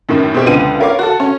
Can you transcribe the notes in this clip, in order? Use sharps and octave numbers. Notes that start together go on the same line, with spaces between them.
F#2 A2 D#3
B2 C4 G4
C#2 D3 F3 B3 C6 D#7
F4 A#4 C#5 F5 D6
F#4 A4
C#4